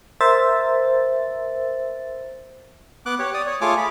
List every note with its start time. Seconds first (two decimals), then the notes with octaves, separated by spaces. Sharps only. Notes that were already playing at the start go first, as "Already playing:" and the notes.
0.21 A#4 C5 E5 A6
3.06 B3 D6 F#6
3.19 G4 C#5
3.34 D5 D#6
3.47 C#5
3.61 A3 F4 G#4 C#5 G#5 D6
3.77 B5